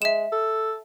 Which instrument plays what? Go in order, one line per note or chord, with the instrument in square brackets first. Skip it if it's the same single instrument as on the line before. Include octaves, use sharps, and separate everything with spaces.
[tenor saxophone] G#3 [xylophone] E5 E7
[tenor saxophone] A4